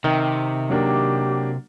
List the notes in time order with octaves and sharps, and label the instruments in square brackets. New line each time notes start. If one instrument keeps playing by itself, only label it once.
[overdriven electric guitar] C3 [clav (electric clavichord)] D#3
[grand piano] F#3 A#3 D4 [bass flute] G4